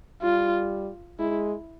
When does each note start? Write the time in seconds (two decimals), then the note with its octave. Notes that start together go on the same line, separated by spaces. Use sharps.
0.22 G3 F4
1.19 G#3 E4